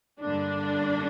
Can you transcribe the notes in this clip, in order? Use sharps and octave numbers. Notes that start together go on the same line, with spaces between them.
G2 D3 A#3 D4